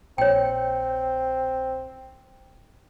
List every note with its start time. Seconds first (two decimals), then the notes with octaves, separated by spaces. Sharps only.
0.18 A#1 C4 C#5 G5